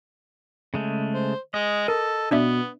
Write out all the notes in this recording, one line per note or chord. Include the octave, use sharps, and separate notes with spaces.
C#3 G#3 A3
C5
G#3 D#5
A4 A#4
B2 B3 D4 D5 E5